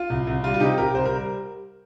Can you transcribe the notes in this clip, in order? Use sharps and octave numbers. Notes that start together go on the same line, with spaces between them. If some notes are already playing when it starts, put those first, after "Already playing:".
Already playing: F4
C2
C2
G3 F4
F4
C3 D#4 G4
C2 G4 A#4
C2 C5
A#4
G3